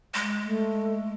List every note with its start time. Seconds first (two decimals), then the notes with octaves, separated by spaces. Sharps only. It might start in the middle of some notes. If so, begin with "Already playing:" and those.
0.14 G#3
0.44 A3